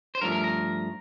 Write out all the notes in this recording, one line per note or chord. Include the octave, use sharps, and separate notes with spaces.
C5
G2 F3 A3 A#4
A#4
A#4